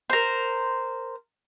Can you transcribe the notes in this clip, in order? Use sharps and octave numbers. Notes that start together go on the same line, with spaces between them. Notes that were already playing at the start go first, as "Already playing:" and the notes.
A#4 C5